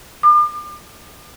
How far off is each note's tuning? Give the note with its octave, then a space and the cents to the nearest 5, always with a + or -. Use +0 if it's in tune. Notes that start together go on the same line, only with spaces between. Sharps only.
D6 +40